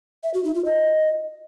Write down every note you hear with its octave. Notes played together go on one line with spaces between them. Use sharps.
E5
F#4
D#4
F4
D#5